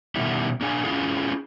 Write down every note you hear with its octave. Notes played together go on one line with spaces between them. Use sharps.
B2 D#3 G3 E4
A#3 D4 G#4 F5 G#5
C#4 E4 F4 G#4